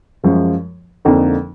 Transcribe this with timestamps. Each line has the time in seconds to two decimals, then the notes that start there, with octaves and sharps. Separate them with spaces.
0.24 F#2 F3 G#3
1.05 F2 D3 F3 A#3 D#4